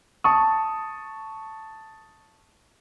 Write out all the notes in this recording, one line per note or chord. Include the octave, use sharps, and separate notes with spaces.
A5 C#6 D#6